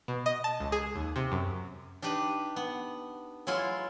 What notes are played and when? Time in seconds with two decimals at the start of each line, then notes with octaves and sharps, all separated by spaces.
0.08 B2
0.26 D#5
0.44 A5
0.60 C#2
0.72 G#4
0.96 D#2
1.16 C3
1.32 F#2
2.02 D4 D#4 G4 B4
2.56 B3
3.47 F#3 G#3 E4 F4